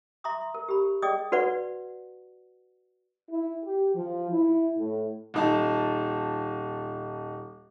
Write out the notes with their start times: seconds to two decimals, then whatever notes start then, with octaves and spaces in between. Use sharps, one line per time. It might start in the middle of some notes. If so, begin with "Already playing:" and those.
0.24 E5 A#5 C6 D6 D#6
0.41 C6
0.54 A#4
0.68 G4 A#4 B5
1.02 G#4 D5 D#5 G5 D6 D#6
1.32 F#4 B4 D5 F#5
3.30 E4
3.63 G4
3.95 F3
4.31 E4
4.77 A2
5.34 D#1 D#4 A5